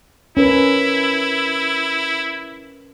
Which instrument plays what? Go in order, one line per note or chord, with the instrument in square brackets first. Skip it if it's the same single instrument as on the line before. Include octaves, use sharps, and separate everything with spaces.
[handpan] C#4 A#4 B4 [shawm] E4